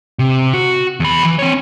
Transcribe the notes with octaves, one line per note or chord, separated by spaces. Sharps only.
C3
F#4
E2 B5
E3
C4 C#5